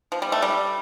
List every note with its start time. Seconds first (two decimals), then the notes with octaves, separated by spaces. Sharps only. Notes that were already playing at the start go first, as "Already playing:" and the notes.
0.12 F3
0.22 G3
0.32 A3
0.42 G3